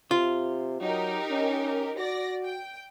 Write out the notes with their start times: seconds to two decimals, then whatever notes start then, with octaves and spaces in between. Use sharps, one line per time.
0.11 C3 F4
0.81 F#3 D#4 G4 A#4
1.31 C#4
1.98 F#4 D5 A#6
2.44 G5